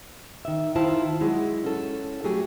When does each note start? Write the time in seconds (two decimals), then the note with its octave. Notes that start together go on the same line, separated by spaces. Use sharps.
0.45 D#3 E5
0.76 D#3 E4 F4 C5 A5
1.21 F#3 G#3 E4
1.64 C#4 A4
2.24 F#3 A3 G4 G#4